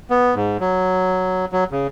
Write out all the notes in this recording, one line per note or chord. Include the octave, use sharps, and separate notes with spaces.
B3
G#2
F#3
F#3
C#3